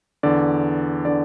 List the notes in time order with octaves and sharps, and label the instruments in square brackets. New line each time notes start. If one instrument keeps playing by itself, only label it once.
[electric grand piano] E2 D3 D5
D3 D5